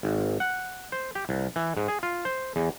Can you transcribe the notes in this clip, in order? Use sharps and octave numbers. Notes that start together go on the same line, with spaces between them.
G#1
F#5
C5
G4
C2
E3
G#2
G#4
F4
C5
E2